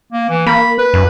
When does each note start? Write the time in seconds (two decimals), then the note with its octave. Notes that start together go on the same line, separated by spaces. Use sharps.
0.13 A#3
0.30 E3
0.46 A#3 B5
0.79 B4
0.94 F#2